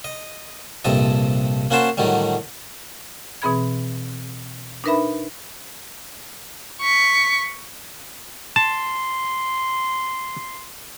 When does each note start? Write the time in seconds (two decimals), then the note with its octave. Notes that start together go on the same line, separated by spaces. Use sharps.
0.04 D#5
0.85 A#1 G2 C3 A4 D#5
1.70 A#3 C#4 F#4 C5 A5 C6
1.97 A2 D3 D#3 F#3 G3
3.42 B2 E3 C4 G#4 B5 G#6
4.84 D4 D#4 A#4 B4 E5 B5
6.81 C#6 B6
8.56 A5 C6